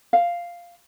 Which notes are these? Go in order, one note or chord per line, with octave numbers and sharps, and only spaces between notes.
F5